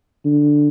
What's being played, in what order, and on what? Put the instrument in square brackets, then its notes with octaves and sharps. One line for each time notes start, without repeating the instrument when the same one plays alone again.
[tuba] D3